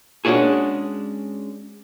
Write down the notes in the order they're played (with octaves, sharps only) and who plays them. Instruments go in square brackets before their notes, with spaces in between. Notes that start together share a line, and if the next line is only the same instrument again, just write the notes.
[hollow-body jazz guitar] G#3 C#4 D4 F#4 G#4